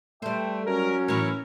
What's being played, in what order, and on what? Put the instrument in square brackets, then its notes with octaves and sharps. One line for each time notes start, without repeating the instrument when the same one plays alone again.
[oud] G3 C5 [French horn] A3 [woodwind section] B4 E5 G5
[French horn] F#3 [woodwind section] C#4 [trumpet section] A#4
[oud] A2 E3 [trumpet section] E4 A#4 C#5